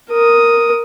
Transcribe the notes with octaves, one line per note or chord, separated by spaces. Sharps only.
A#4 D#6